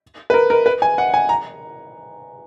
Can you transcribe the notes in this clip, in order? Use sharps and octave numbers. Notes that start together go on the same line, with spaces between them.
B4
A#4
A#4
B4
G#5
F#5
G#5
A#5